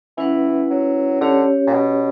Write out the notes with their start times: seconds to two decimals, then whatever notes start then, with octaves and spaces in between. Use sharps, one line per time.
0.17 E3 C#4 E4 B4 F#5
0.70 F#3
1.21 D3 C#4 G4 C#5
1.67 A#2
1.74 B2